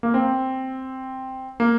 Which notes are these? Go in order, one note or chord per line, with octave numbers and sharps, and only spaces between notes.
A#3
C4
A#3